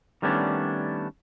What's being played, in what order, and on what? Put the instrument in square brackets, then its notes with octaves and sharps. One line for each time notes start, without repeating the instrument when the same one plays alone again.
[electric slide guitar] D#3 G3 A3 B3 C#4 D4